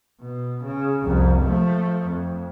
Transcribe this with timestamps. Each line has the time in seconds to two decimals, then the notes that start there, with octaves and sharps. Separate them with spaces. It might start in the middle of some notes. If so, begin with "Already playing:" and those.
0.21 B2
0.64 C#3
1.04 C2 F2
1.42 F3 A3
2.06 F2